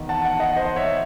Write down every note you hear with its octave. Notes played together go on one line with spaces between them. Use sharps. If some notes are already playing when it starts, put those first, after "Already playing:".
Already playing: E2 D#3
F#5 A5
F#5 A5
D#5 F#5
C5 D#5
C#5 E5